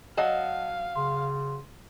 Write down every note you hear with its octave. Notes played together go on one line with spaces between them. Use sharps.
F#3 D#5 F5 F#5 A5
C#3 C6